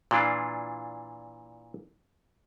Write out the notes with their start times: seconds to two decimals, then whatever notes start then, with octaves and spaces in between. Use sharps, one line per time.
0.11 A#2 E3 D4 F4